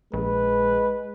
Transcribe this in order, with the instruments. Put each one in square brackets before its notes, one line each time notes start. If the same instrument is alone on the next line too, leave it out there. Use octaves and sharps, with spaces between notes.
[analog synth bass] A#1 [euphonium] G#3 [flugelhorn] B4